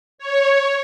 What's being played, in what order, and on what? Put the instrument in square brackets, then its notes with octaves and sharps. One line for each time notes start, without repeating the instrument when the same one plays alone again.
[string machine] C#5